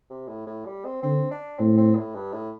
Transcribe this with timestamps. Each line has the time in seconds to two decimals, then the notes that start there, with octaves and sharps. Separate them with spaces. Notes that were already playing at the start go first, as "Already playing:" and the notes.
0.10 C3
0.28 A2
0.47 A2
0.66 G3
0.85 C4
1.03 D3 C4
1.31 D4
1.59 A2 C4
1.78 C4
1.96 A2
2.15 G2
2.33 A2